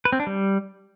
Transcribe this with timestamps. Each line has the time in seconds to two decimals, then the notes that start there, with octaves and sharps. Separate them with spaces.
0.05 B4
0.12 C4
0.20 D4
0.27 G3